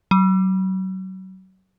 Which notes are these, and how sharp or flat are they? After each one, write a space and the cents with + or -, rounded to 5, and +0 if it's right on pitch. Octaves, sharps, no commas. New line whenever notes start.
F#3 +30